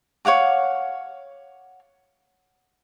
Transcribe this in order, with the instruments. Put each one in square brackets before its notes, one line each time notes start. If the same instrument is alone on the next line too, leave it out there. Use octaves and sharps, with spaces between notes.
[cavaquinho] C#5 F5 F#5 D6